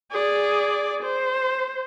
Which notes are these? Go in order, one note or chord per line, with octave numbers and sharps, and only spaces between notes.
G#4 D5
C5